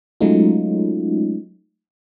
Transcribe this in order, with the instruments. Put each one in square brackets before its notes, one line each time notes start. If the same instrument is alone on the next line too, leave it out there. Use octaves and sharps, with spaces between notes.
[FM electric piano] F#3 G#3 A3 C#4 D#4 F4